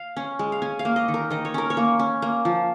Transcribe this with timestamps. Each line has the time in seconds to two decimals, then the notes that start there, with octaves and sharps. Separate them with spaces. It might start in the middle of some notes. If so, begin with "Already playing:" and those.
Already playing: F5
0.16 C#4
0.39 G#3
0.52 F5
0.62 C#4 G#5
0.79 F5
0.85 A#3
0.96 D#5
1.08 D#3
1.14 A#4
1.30 D#3 D#5
1.45 C#5
1.54 C#4 A#4
1.70 C#5
1.77 A#3
1.99 C#4
2.22 A#3
2.45 F3